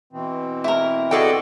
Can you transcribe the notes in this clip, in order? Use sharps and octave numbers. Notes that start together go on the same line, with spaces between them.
B2 E3 C4
E4 A#4
F#4 G#4 A4 D5 D#5 G5